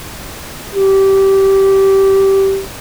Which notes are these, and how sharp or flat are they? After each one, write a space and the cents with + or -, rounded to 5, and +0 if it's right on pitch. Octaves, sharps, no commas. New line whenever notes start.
G4 -15